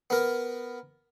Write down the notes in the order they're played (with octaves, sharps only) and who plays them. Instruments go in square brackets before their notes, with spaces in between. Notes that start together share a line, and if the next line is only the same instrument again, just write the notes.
[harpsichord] B3 A#4